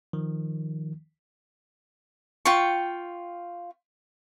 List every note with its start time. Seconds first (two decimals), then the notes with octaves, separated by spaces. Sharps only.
0.13 D#3 F3
2.45 F4 G5 C#6